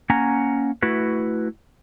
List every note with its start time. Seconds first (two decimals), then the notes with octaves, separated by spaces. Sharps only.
0.10 A#3 C#4 F#5 G#5 A#5
0.82 A3 E4 F#4 B4